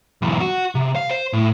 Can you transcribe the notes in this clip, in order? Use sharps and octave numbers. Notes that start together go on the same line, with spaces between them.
B1 E2
F#4
C3
F5
C5
A2